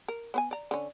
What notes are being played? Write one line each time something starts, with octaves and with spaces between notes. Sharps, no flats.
A#4
B3 C5 G#5
D5 A#5
D3 C#4